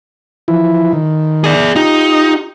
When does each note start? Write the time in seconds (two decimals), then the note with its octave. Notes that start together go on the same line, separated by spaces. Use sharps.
0.48 E3 F3 E4
0.93 D#3
1.44 G#4 D5
1.76 D#4 F4 G4